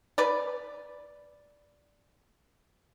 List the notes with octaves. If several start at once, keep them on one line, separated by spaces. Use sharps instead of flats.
B4 D5